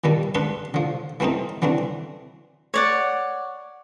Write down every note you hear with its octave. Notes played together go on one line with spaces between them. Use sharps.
A#2 D#3 G3 A4
G#2 D4 A4 B4 F#5 C6
D3 F3
E3 F#3 A3 C4 D#4
D3 E3 F#3 C4 D4
C#5 D5 F#5